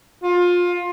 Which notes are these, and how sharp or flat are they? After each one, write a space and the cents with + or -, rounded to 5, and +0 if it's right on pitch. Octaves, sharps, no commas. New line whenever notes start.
F4 +20